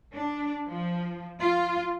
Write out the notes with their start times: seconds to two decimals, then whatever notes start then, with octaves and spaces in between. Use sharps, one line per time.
0.13 D4
0.68 F3
1.40 F4